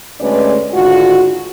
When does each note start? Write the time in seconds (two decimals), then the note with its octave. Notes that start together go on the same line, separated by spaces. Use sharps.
0.21 D2 G#3 A3 C#4 B4 D5
0.73 G#2 D3 D#3 F4 F#4